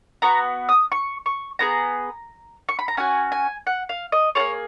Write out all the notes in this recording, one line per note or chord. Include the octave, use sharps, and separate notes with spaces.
B3 F#4 A#5
D#6
C#6
C#6
B3 F4 G#4 A#5
C#6
B5
A#5
C#4 F#4 G#5
G#5
F#5
F5
D#5
A#3 F4 G#4 C#5